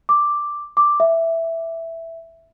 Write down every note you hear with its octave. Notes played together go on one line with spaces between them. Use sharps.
D6
D6
E5